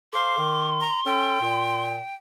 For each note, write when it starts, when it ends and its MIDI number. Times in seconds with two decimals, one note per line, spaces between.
0.13 0.36 69
0.13 0.36 72
0.13 0.36 77
0.13 1.84 84
0.13 0.69 86
0.37 0.84 51
0.81 1.01 82
1.06 1.38 61
1.06 1.38 69
1.06 2.15 79
1.41 1.96 46